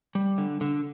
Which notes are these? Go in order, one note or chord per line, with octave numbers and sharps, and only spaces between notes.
G3
D3
D3